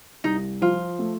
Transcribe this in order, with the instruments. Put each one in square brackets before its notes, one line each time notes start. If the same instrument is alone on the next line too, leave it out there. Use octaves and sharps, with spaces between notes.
[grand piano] C2 [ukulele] D#4
[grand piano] F3 [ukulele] F4
[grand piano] A3